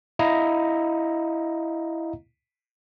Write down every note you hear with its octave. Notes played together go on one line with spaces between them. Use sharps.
E4 D#5 F5 A#5